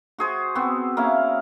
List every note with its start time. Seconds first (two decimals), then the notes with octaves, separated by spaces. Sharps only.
0.18 F#4 G#4 C5
0.55 B3 C4 F#4
0.97 A#3 C#4 E4 F5